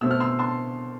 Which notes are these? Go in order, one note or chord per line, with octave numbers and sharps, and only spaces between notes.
B2 A3 C4 E6
F6
C6 E6
A5 C6